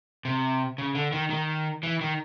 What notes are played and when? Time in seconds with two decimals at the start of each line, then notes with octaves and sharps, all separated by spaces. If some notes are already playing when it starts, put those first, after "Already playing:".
0.25 C3
0.78 C#3
0.95 D3
1.12 D#3
1.30 D#3
1.83 E3
2.01 D#3